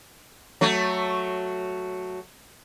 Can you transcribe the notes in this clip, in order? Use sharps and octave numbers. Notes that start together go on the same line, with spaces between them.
F#3 A3